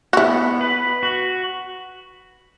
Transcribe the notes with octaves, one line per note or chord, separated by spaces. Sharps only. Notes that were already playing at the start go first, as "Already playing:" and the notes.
F#4
B3 E4
B4
F#4